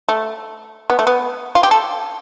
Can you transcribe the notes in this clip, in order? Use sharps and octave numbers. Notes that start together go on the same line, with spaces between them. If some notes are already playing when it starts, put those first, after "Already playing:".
A3
B3
A3
B3
F4
G4
A4